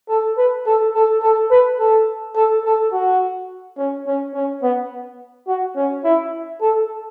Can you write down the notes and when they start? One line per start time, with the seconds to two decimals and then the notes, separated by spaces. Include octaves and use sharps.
0.09 A4
0.37 B4
0.66 A4
0.95 A4
1.22 A4
1.51 B4
1.79 A4
2.36 A4
2.65 A4
2.93 F#4
3.78 C#4
4.07 C#4
4.35 C#4
4.63 B3
5.48 F#4
5.76 C#4
6.04 E4
6.61 A4